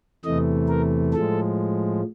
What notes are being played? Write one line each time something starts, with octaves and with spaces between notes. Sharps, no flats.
E2 C3 E3 A3 D#5
A#4
A2 F3 G#3 A4